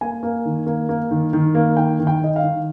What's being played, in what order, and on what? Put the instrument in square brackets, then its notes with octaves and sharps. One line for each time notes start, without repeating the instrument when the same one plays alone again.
[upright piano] A#3 G#5
A#3
D#3
A#3
A#3
D#3
D#3
A#3
D#3 G5
D#3
G5
D#3 D#5
F5
D#3